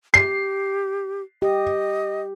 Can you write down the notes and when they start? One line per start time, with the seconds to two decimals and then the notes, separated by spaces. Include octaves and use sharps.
0.14 G4 C7
1.42 G4 D#5